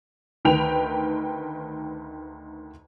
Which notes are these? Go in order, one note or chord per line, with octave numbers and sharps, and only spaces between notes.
D2 D#3 B4 G5 F7